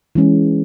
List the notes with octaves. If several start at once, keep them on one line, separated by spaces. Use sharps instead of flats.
E3 G#3 C#4